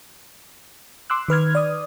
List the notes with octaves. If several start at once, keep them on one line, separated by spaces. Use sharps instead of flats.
C6 D6 E6 F#6
D#3 B4 F6 G#6
D5 D#6